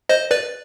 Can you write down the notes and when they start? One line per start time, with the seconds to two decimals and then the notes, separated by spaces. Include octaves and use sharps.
0.09 C5 D#5
0.31 B4 D5